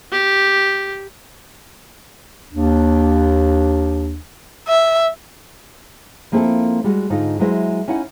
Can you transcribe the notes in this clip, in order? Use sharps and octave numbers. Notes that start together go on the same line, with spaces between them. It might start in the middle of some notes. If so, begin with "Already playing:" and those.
G4
D#2 D4
E5
F3 A#3 C4 E4 G#4 A4
G3 G#3 F#4
G#2 D3 D#4 F4
F#3 G#3 E4 C5 E5
C#4 D#4 E4 F#5